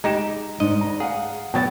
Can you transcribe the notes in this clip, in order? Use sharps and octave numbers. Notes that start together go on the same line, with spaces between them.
G#3 D#4 G4 A#5 E7
G#2 D5 D#5
A#5
G#4 F5 F#5
B2 F#3 B3 G5 A6